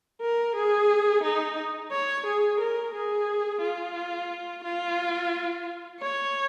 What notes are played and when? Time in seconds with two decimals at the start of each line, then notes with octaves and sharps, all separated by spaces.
0.21 A#4
0.55 G#4
1.23 D#4
1.92 C#5
2.26 G#4
2.60 A#4
2.94 G#4
3.62 F4
4.64 F4
6.00 C#5